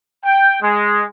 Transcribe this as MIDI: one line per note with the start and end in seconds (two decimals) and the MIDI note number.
0.25 0.57 79
0.62 1.03 56